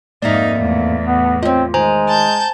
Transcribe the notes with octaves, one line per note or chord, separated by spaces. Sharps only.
F2 G#2 A#3 D#4 D5 E5
E2 A2
B3
C4 F4 C#5 D#5
D#3 G#3 C5 G#5 A#5
A5 G6